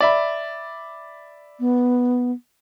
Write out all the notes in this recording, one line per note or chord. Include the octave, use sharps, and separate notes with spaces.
D5 E5 B5
B3